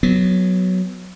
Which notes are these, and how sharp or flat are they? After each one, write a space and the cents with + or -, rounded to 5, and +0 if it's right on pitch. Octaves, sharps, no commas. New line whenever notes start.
F#3 +0 B3 +0